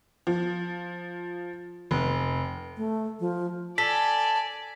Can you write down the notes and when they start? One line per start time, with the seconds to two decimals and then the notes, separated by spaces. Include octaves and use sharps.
0.27 F3
1.91 F1
2.77 A3
3.20 F3
3.78 A4 D5 G#5 B6